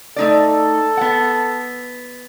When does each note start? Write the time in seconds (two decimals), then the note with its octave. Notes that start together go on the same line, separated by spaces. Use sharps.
0.16 A3 D#4 A4 D5
0.97 B3 F#5